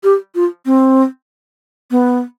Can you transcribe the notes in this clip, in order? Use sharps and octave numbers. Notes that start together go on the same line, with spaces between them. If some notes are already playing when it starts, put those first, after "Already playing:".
G4
F4
C4
B3